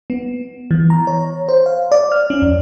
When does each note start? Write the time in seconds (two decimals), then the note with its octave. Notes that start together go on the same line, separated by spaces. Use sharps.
0.10 B3
0.71 E3
0.90 A#5
1.07 C#5
1.49 C5
1.66 F5
1.92 D5
2.12 F6
2.30 C#4
2.42 F2